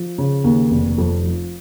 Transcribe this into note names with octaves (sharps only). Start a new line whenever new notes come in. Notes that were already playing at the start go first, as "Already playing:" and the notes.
Already playing: F3
C#3
D#2
F1
F2
F3